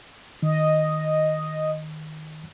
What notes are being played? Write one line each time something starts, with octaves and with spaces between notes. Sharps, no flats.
D#3 D#5